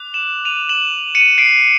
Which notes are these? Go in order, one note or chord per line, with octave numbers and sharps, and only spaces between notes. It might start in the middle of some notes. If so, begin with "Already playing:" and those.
Already playing: D6 F#6
E7 F#7
D#7 F7
E7 F#7
C#7 D#7
C7 D7